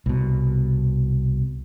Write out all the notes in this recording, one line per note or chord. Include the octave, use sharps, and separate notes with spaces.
C2 B2